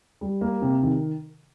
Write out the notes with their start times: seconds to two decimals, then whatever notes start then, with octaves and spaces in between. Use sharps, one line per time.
0.21 G3
0.41 A#3
0.62 C3
0.83 D#3